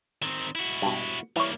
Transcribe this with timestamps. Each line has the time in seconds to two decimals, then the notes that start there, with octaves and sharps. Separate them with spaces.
0.23 D#3 C4
0.55 E4 F#4
0.82 G2 B2
1.36 E3 G3 A#3 C#5